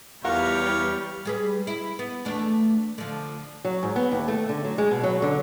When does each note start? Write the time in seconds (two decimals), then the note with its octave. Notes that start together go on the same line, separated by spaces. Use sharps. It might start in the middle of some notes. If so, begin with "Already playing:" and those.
0.24 E2 G3 F4 G4 A#4 C#5 F5 F#5
1.25 G3 G#4 B4
1.67 E4
1.99 B3
2.25 E2 A3 D4
2.98 D3 F3
3.65 F#3
3.83 G#2
3.96 B3
4.12 D#2
4.28 A3
4.49 D3
4.64 F#3
4.78 G#3
4.91 B2
5.04 F#3
5.22 D3